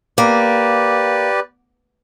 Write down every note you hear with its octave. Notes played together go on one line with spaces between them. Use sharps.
A#3 G4 B4 D5